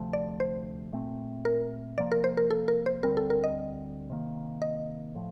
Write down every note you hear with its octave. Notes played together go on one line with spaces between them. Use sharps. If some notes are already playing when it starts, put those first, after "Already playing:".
Already playing: D2 C3 F3 A3
D5
C5
A#2 A3 C4
A#4
C3 F3 A#3 D5
A#4
C5
A#4
A4
A#4
C5
D2 D3 G3 C4 A#4
A4
A#4
D#5
C3 D#3 A#3
D#5
A2 F3